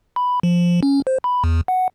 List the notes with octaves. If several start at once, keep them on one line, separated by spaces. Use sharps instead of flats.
B5
F3
C#4
C5
B5
E2
F#5